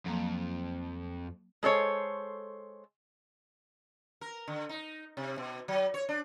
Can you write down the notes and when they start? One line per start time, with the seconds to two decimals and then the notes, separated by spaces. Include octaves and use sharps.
0.06 F2 F#3 A#3
1.63 G#3 A4 C5 C#5
4.21 A#4
4.48 D3
4.69 D#4
5.17 C3
5.38 B2
5.68 F#3
5.94 C#5
6.09 D4